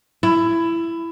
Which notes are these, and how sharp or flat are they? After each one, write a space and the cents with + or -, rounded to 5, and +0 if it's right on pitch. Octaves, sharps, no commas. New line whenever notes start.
E4 +15